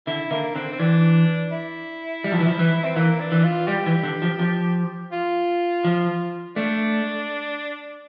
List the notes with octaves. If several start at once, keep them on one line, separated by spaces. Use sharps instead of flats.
D3 E4
D3 A#3
D3 C4
C4
E3 D4
E4
G3
F3
E3
F3
E3
C4
E3 A#3
D4
E3
F4
G3 G4
E3
D3
F3
F3
F4
F3
A3 D4